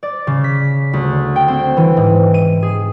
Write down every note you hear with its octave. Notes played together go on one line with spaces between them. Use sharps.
D5
C#3
B6
D2
G5
C4
E3
G#2
D#7
G#4